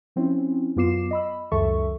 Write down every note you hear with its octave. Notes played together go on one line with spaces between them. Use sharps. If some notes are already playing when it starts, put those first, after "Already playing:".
F3 C4 C#4 E4
F#2 B3 F4 D6 C7 E7
D#5 B5 E6
C#2 F#2 D#3 A4 E5 C#6